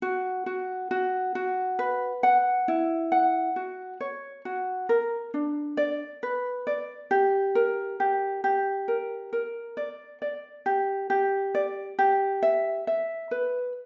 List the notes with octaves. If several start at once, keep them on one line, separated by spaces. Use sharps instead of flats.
F#4
F#4
F#4
F#4
B4
F#5
E4
F#5
F#4
C#5
F#4
A#4
D4
D5
B4
D5
G4
A#4
G4
G4
A#4
A#4
D5
D5
G4
G4
D5
G4
E5
E5
B4